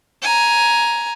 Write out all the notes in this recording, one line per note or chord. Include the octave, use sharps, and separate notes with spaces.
G#5 A#5